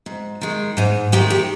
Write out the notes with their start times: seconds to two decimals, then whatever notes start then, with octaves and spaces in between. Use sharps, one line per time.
0.06 G#2
0.41 D#3 G#3
0.77 G#2 D#4
1.12 D#3 G#3 G4
1.30 G4